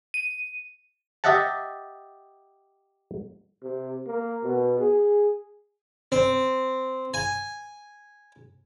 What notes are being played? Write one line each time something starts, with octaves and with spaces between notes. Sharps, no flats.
D#7
G4 D#5 E5 F#5 A5
C3
A#3
B2
G#4
C4
G#5